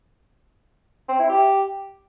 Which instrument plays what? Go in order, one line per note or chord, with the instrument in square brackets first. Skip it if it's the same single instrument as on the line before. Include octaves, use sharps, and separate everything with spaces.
[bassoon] C4
E4
G4